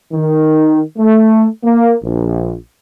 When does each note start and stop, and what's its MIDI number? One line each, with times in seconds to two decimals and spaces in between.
0.13 0.81 51
0.98 1.46 57
1.64 1.96 58
2.03 2.54 34